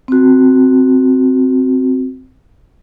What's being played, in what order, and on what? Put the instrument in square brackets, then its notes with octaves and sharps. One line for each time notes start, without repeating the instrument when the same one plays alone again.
[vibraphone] C4 F#4